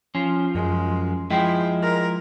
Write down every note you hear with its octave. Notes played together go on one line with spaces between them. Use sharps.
F3 C#4
F#2 G#3
F3 G#3 E4 G5
A#4